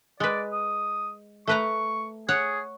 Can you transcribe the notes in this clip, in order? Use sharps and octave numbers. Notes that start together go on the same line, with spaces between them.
G#3 B4 D5
D#6
A3 B4 A#5 C#6
G#4 C#5 F#5